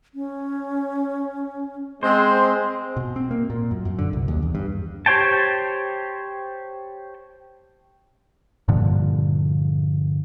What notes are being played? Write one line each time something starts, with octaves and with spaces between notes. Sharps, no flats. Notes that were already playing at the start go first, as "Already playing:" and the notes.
C#4
G#3 C4 C5
B2
C4
A#3
A#2
F#2
F#2
D3
C2
D#2
E2
G2
G4 C5 C#5 G5 A5
G2 A#2 D3 F3